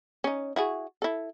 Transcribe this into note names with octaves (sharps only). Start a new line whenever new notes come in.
C#4 D#4
E4 F#4 G#4
E4 A4